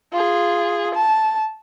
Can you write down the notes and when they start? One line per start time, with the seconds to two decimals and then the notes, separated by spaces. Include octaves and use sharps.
0.13 F4 G#4
0.95 A5